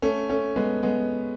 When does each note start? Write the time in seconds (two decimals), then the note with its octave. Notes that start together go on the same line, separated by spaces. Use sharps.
0.02 A3 C#4
0.29 A3 C#4
0.56 G#3 B3
0.83 G#3 B3